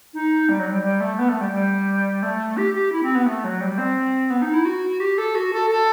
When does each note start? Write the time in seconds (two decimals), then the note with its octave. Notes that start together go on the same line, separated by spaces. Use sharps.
0.14 D#4
0.49 G3
0.59 F#3
0.72 G3
0.83 G3
1.01 A3
1.19 B3
1.29 A3
1.41 G3
1.52 G3
2.23 A3
2.57 G4
2.74 G4
2.92 E4
3.03 C4
3.15 B3
3.26 A3
3.44 F#3
3.61 G3
3.78 C4
4.30 B3
4.42 D#4
4.54 E4
4.65 F#4
5.00 G4
5.18 A4
5.35 F#4
5.53 A4
5.71 A4